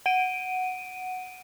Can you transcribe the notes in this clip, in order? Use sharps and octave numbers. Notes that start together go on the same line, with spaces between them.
F#5 D7 D#7